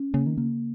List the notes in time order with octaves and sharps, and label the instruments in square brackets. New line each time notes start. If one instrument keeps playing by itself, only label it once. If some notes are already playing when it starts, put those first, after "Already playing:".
Already playing: [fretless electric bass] C#4
[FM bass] C#3 [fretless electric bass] A#3
[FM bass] D#3
[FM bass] C#3 [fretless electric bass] A#3